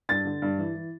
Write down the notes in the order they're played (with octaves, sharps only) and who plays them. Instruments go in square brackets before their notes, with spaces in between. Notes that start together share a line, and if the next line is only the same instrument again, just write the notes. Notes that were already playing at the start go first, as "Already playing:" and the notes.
[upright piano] G2 A6
D3
G2
E3
E3